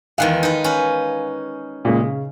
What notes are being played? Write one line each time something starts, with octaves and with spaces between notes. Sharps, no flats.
E2 D#3 G#3 F5 F#6
D#4 B4
C#4 B4
A#2 C#3 G#3
C#3